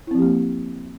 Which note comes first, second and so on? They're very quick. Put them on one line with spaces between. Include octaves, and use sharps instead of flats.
E4 C4 F3 G4 A#3